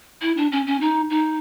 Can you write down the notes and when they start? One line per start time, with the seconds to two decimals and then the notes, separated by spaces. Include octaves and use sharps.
0.22 E4
0.37 D4
0.52 C#4
0.66 C#4
0.81 D#4
1.10 D#4